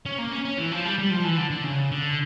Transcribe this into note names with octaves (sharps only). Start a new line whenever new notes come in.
C#4
A#3
C#4
C#4
E3
F3
G3
G3
F3
E3
D3
D3
C#3
D3